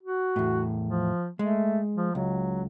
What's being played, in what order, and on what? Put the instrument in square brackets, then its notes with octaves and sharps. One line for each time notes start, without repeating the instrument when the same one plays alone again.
[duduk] F#4
[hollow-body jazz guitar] E2 A2
[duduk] F3
[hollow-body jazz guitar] G#3 [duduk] A3
[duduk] F3
[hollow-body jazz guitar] C#2 [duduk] F#3